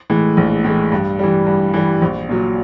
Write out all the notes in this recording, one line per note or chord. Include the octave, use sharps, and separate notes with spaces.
A2 E3 G#3
A#1
A2 E3 G#3
G2
E3 G3
G2
E3 G3
A#1
A#2 F#3